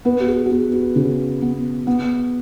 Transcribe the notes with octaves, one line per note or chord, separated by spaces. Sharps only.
B3 B4
F#4
G#4
F#4
B3 G#4
F#4
C#3 G#4
B3
B3